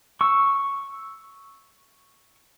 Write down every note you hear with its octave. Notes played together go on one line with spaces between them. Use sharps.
C#6 E6